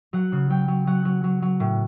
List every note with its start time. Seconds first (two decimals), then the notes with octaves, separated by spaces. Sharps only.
0.13 F#3 F#5
0.32 C#3
0.50 F#3 G5
0.68 F#3
0.87 F#3 F#5
1.05 F#3
1.24 F#3
1.42 F#3
1.60 A2